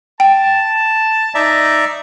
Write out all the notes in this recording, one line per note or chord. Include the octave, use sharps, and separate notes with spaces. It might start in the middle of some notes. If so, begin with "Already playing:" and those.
G5 A5
D#4 D5 E5 A#5